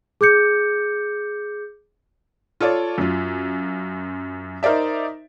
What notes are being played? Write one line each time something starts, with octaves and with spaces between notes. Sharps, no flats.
G#4 D6 G6 C#7
F4 A4 C#5 D5
F#2 F4
D#4 A#4 C5 D5 E5